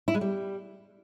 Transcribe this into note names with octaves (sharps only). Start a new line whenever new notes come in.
E4
G#3
G3